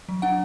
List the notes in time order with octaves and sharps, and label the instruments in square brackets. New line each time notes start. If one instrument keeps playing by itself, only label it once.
[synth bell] F#3
D4 F#5